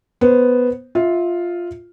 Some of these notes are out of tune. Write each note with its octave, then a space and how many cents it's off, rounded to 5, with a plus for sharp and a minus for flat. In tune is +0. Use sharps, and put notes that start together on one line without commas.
B3 +0 C5 +0
F4 +0 E5 -20